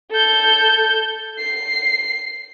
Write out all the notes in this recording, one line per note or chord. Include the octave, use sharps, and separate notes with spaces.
A4 G6
C7